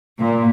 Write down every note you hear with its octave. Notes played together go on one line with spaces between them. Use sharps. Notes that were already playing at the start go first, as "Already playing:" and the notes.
A#2